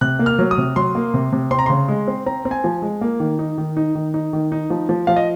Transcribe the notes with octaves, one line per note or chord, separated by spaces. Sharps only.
C3 F#6
A#3
F6
F#3
D#6
C3
F#3 C6
A#3
C3
C3
C4 C6
A#5
C#3 C6
G#3
C4
C4 A#5
C4
G#5
F3
G#3
A#3
D#3
D#4
D#3
D#4
D#3
D#4
D#3
D#4
F3
F3
F3 F5
D#5